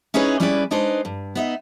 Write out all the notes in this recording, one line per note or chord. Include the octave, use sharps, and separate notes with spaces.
C#4 D#4 E4 G#4 B4 C#5
G3 C#4 E4 G#4 B4 D5
G#3 D4 D#4 B4 C5
G2
B3 D#4 E5